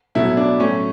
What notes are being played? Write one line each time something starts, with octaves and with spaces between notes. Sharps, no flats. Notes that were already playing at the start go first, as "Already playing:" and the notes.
B2 F#3 A3 E4
D4
A2 F#3 A3 C#4